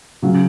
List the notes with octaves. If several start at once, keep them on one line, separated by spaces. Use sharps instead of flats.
C#3 F#3 C#4